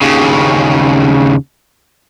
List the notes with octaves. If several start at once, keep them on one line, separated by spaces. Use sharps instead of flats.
D#2 C#3